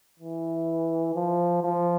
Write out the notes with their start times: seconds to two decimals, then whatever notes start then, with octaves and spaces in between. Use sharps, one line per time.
0.19 E3
1.15 F3
1.63 F3